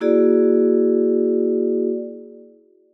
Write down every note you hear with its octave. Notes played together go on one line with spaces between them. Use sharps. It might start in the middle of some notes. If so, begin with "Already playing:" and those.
A#3 E4 F#4 G#4 D5